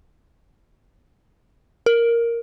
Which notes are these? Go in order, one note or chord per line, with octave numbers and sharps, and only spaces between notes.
A#4